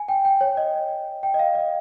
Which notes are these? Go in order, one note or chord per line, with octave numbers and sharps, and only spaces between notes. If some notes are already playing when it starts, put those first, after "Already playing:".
Already playing: G#5
G5
G5
C#5
D#5
G5
D#5
F5
D#5